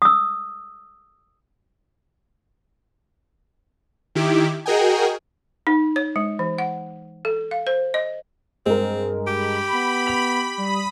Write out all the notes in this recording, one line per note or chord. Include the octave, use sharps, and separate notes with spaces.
D#6 E6
D#3 E4 G4 D6
F#4 G#4 A#4 D#5 G5 G#5
D#4
C#5
G#3
E3
F#5
A4
F5
C5
D#5
G2 G#3 C4 A#4
G4 B5
B3
F7
G3 B5 D#6